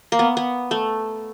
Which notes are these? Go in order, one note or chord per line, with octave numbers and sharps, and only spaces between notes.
A#3
B3
B3
A3